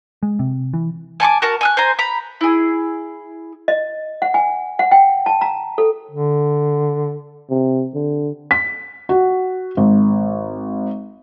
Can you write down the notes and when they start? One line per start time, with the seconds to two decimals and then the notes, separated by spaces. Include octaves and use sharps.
0.23 G#3
0.39 C3
0.74 E3
1.20 G#5 A5 C#6 D6
1.42 F#4 A#4 A5
1.61 G#5 E6 F#6
1.77 C5 G#5 A#5
1.99 A#5 B5
2.41 E4 G#4
3.68 D#5
4.22 F#5
4.34 G#5
4.79 F#5
4.91 G5
5.26 A5
5.41 A#5
5.78 A4
6.11 D3
7.50 C3
7.94 D3
8.51 B6
9.09 F#4
9.77 G#1